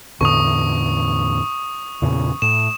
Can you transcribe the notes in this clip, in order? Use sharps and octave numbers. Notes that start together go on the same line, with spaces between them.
E2 A2 D3 C#6 D#6
E2 A#2 C#3
A2 E7